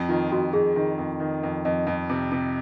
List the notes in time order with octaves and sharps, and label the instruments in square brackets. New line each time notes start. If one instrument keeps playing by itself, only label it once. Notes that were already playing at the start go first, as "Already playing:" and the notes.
Already playing: [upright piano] F2
[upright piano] D#3 [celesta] F4
[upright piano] F2 [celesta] F#4
[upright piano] F2 [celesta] G#4
[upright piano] D#3
F2
D#3
F2
[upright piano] F2 [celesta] D#5
[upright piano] F2
C3
C3